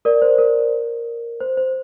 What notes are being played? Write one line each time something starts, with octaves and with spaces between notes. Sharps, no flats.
A#4 D5
C5
A#4
C5
C5